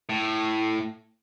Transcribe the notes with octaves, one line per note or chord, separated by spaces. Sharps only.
A2